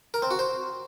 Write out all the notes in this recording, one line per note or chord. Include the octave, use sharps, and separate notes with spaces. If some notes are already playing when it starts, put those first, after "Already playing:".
A#4
C4
F#4
C5